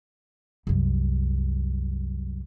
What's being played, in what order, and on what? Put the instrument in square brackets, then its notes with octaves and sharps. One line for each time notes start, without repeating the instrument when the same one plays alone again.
[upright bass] C2 F#2